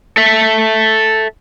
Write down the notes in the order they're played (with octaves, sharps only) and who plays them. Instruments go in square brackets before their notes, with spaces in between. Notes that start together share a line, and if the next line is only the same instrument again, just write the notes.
[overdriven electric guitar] A4 E5